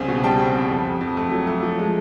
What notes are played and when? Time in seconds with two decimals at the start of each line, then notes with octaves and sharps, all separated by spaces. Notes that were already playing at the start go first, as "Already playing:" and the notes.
Already playing: C2 C#3 C4 G#5
0.08 B2
0.23 G3 G5 A5
0.39 C4
0.54 C4
0.70 F2
0.85 F2
1.01 F2
1.17 A3
1.32 F#3
1.47 A3
1.63 F3
1.79 G#3